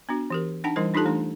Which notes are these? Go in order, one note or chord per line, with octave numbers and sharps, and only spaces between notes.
B3 D4 F#4
E3 G4 A#4
D4 D#4 F#5 G5 A5
E3 G3 E4 A#4 C5
D4 D#4 F4 G4 A4 A5
E3 A3 D4